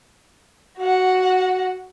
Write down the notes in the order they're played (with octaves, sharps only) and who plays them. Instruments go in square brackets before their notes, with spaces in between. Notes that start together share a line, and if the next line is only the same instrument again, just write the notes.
[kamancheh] F#4 F#5